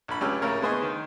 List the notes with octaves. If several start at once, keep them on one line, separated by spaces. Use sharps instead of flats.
A#1 B5
C#2 C#4 G4 E6 F6
A2 C#3 E4 A#4 C#5
B3 G#4 C5 D#5 G#5 C#6
D#3